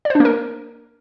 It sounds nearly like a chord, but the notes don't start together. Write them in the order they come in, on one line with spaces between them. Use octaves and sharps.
D5 C5 D4 A#3 A#4